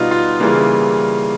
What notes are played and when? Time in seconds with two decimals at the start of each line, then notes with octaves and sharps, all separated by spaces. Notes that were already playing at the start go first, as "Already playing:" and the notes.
Already playing: B2 G3 B3 D#4 F4
0.11 F4
0.40 C#3 E3 G3 A#3